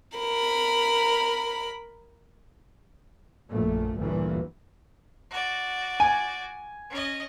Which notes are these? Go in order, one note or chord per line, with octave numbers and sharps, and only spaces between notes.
A#4 B5
A#1 F#2 A#2 A3
G1 D2 G2 A#2 E3
F#4 D5
G#5
C#4 D#5